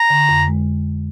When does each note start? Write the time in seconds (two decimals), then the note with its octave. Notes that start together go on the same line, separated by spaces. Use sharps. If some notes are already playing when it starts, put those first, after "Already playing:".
Already playing: A#5
0.10 D3
0.29 F2
0.48 G#3